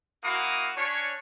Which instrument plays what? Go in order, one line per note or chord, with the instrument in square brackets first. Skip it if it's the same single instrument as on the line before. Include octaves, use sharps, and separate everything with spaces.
[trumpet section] A#3 E4 F#4 F5 D#6
C#4 D4 C#5